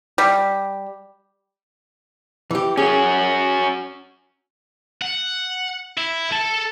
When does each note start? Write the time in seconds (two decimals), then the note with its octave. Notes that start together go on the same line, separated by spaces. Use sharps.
0.18 G3
2.51 E3 G4
2.77 C#4 F#4 G#4
5.02 F#5
5.98 E4
6.33 A4 A5